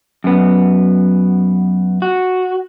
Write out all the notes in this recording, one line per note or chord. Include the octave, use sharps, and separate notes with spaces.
F#2 B3
F#4